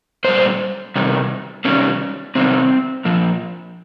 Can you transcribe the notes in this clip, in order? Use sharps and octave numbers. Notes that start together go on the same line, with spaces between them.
A#2 G3 C5
C3 D#3 G3
C3 D#3 G3 C#4
C3 D#3 G3 C4
A#2 F3